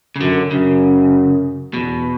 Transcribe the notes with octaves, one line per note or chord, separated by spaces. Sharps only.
C#3
F#2 D3
F#2 C#3
E2 B2